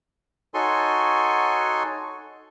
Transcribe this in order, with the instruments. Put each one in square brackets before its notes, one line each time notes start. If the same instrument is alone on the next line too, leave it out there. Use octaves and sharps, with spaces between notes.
[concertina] D#4 F#4 A4 C#5 G#5 C6